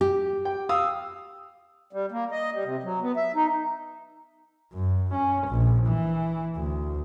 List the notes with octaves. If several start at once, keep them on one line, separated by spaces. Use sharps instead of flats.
G4
G5
F5 D#6 E6
G3
A#3
D#5
G3
C3
F#3
B3
E5
D#4
F#2
C#4
A#1
E3
D2